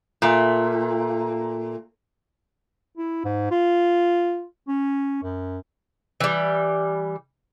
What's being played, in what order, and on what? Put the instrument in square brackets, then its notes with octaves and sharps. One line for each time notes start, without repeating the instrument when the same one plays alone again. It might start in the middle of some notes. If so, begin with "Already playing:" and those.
[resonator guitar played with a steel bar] A#2 A3
[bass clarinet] E4
G#2
F4
C#4
F#2
[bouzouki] E3 G3